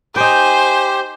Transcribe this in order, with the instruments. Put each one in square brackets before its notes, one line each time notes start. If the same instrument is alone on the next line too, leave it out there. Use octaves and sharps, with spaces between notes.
[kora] D#4 G5 [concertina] G4 [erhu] C5 [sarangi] G#5